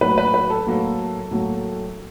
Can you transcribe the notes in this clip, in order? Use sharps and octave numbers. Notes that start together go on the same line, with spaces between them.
A2 F#3 A#3 B4
B4
B4
A4
A2 F#3 A#3
A2 F#3 A#3